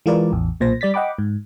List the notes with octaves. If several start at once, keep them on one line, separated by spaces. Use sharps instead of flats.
E3 G#3 F4 A#4 B4 D5
A1 E2
B1 A#2 C5 A#6
G3 D5 A6 B6
D#5 F#5 G5 B5 D6
G#2